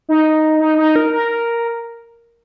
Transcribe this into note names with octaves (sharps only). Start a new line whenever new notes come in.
D#4
D#4
D#4
A#4
A#4